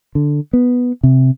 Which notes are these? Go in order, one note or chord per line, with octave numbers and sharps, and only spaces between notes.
D3
B3
C3